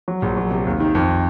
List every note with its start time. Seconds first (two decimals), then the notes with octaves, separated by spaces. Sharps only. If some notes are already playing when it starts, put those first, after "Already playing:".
0.08 F#3
0.22 A#1
0.37 F#3
0.51 C3
0.66 D#2
0.80 D#3
0.95 F2